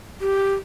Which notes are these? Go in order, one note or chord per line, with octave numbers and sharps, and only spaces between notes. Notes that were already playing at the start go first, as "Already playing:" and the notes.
G4